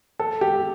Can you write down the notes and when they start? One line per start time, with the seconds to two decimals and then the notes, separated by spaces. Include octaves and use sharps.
0.19 A4
0.41 G4